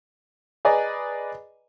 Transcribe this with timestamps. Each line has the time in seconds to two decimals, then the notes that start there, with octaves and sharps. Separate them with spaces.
0.65 G#4 B4 D5 D#5 G#5 A#5